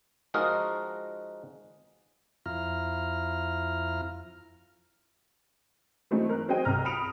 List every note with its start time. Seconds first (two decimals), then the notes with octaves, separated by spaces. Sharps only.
0.34 F3 G#3 D#4 F#4 A#4 D#5
2.46 F2 E4 F4 A#5 F6
6.11 E3 F#3 G#3 A3 C4 D#4
6.29 A#4 F#6
6.48 F#3 C4 G#4 D#5 G5 D#7
6.65 C2 A#5 F6 A#6
6.85 B5 D#6 C#7 D7 F7